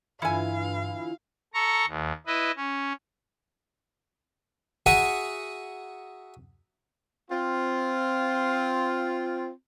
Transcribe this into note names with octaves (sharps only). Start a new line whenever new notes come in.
G2 D3 E3 E4 F4 F5 G#5
A4 A#5 C#6
D#2
E4 B4 D#5
C#4
F#4 G#4 E5 F#5 A#5 D#6
C4 F4